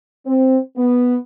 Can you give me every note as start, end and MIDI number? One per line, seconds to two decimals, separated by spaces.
0.25 0.56 60
0.76 1.15 59